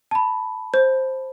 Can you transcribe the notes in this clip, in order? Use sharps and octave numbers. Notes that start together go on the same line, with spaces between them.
A5 B5
C5